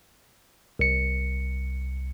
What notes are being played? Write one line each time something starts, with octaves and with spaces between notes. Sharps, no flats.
C2 C#7